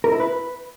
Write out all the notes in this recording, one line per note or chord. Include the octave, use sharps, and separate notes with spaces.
A#4
E4
B4